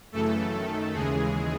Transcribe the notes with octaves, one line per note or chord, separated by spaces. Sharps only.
F#2 C#3 E3 A3 A4
F#2 D#3
D#2 C#3 E3 G#3 G#4